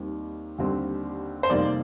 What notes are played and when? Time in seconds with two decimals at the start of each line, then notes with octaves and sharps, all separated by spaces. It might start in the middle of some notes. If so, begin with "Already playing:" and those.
Already playing: D#2 D#3 G3 C4
0.58 D#2 D3 G3 C4
1.43 C5
1.50 F1 F2 D#3 G3 A#3 D5